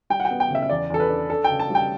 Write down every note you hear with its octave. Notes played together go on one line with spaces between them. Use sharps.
G3 G5
F#5
G5
B3
G5
C#3 E5
E5
E2 D5
E2 A4
B4
D4
D4 A4
G5
C#3
A5
G3 G5